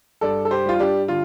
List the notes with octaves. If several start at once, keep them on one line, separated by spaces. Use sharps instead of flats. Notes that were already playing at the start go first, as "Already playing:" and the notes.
G2 A4 D5
A4
G4 C5
G3 F4
D4 G4
D3 F4